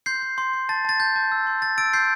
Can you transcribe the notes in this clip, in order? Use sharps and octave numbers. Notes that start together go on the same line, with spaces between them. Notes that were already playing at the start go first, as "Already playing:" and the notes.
C6 G6 C7
G6
C6
C6
A5 A6
A5 A6
A5 G6
A5
E6
C6
C6 A6
E6 A6 D7
C6 G6 C7